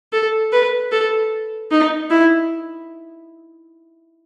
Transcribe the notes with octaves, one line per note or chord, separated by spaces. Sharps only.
A4
B4
A4
D#4
E4